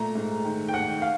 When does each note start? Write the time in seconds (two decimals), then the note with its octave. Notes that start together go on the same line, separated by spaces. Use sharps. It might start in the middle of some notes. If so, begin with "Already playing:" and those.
Already playing: A#2 A3 A#5
0.15 G#2
0.45 D#3
0.68 G5
0.73 D#2 F#5
1.02 F5